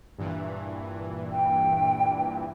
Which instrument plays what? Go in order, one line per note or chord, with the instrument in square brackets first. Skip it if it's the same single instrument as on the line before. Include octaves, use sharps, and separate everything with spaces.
[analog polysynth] G2 A#2 E3
[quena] G5